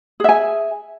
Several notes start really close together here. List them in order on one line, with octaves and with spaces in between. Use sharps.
G#4 E5 G#5